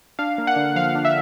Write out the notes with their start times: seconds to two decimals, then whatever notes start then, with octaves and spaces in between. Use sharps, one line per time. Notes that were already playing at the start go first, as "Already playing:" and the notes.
0.19 D4 F5
0.38 A#3
0.47 F#5
0.56 D3
0.76 F3 F5
0.95 D4
1.05 E5